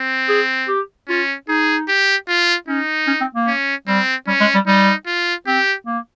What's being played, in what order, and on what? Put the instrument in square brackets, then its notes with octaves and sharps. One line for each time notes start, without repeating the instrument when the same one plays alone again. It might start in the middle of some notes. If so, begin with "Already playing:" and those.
Already playing: [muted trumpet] C4
[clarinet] G#4
G4
[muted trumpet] C#4 [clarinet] F4
[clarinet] D#4 [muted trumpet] G#4
[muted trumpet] G4
F4
[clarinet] C#4 [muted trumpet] D#4
[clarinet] C#4
C4
A#3
[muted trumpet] C#4
[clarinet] G3 [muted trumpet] C4
[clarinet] G3 [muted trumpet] C#4
[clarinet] G#3
G3
[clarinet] G3 [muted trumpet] D#4
[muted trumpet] F4
[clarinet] C4 [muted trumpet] G4
[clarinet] A#3